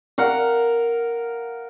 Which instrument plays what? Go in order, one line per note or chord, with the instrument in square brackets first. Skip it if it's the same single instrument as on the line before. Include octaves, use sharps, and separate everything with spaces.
[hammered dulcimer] A#4 F5 F#5